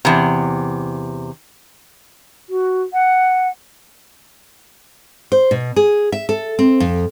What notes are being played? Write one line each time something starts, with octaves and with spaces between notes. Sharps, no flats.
E2 C3
F#4
F#5
C5
B2
G#4
E5
A4
C4
F2